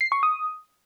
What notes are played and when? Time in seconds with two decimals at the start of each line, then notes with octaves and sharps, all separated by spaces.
0.01 C7
0.12 C#6
0.23 D#6